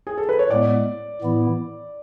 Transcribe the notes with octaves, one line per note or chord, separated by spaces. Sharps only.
G#4
A4
B4
C#5
A2 G#3 B3 D5
A2 E3 B3 E4